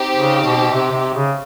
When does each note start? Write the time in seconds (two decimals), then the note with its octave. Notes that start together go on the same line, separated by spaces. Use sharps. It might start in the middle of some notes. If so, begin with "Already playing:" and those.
Already playing: C4 D#4 G4
0.16 C#3
0.43 B2
0.71 C3
0.92 C3
1.14 C#3